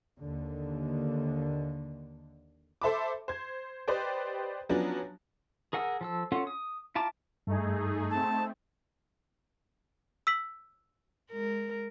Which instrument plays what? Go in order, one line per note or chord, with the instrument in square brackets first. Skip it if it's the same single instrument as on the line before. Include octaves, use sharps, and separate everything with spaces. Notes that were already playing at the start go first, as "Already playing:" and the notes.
[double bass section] D#2 D3
[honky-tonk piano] A4 C5 E5 A5 B5 D6
C5 G#6
G4 B4 C5 D5 D#5 G5
F3 F#3 B3 C#4 D4
[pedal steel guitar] G#4 A#4 F#5 G#5 E6
F3 A4 E6
C#4 F4 A4 F#5
D#6
E4 F4 A5 A#5 D6
[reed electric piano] G2 [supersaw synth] A3 D#4 G#4
[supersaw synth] A3 C4 [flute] A5
[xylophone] E6 B6 F#7
[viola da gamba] G#3 A#4